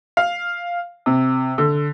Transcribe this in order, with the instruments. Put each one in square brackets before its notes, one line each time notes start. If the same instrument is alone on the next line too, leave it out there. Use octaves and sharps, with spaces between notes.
[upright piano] F5
C3
D3